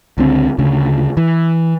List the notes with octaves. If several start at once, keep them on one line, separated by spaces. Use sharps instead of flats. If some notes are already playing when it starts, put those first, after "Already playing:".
C#2 D3 C4
D2 C#3
E3